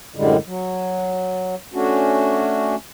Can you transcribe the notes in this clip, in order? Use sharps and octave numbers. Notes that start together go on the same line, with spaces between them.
F#2 A2 D3 G3 G#3
F#3
A3 C#4 D4 F#4